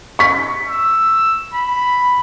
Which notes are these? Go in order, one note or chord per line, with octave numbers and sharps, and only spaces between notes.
C#6 B6
E6
B5